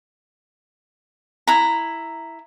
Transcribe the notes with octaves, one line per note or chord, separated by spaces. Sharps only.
E4 A#5